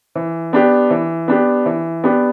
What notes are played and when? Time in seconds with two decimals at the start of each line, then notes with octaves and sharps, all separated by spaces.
0.15 E3
0.53 B3 D4 G4
0.91 E3
1.28 B3 D4 G4
1.66 E3
2.04 B3 D4 G4